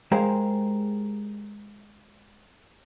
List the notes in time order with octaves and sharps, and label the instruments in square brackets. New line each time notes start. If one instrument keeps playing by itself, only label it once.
[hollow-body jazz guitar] G#3 G4 G#4 A#4 C5 F5